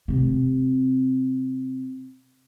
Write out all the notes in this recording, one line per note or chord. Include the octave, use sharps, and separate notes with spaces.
C3 C4